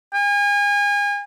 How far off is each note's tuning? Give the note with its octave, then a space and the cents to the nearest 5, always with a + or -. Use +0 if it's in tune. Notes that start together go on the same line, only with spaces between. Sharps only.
G#5 -35